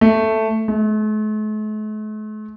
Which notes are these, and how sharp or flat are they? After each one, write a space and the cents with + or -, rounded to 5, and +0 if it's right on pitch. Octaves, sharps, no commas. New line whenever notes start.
A3 +5
A3 -45